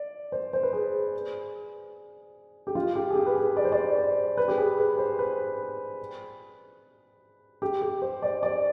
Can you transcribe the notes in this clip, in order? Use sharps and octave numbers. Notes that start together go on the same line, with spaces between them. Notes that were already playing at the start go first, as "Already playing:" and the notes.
Already playing: D5
C5
C5
B4
G#4
G4
F4
G4
G#4
G4
B4
G#4
D5
C5
D5
C5
B4
G4
G#4
B4
C5
B4
G4
G4
C5
D5
D5